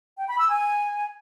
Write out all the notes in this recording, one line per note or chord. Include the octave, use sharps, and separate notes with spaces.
G5
B5
E6
G#5